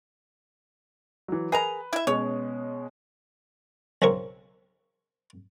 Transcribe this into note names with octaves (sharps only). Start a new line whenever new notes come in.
E3 F#3
G#4 A#4 B4 A#5
E4 E5
B2 G#3 C#4 C#5
B1 C#3 C4 A#4 C#6